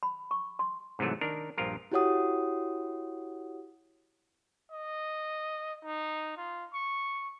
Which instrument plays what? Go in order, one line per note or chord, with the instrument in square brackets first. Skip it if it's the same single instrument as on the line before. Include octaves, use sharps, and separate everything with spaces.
[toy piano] B5
C#6
C6
[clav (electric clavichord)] G#2 C3 E3 F#3 A3
D#3 D4 A#4
A#1 G2 F3 F4 A#4
[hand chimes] E4 F#4 G4 C#5 F#5 D#6
[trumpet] D#5
D#4
F4
C#6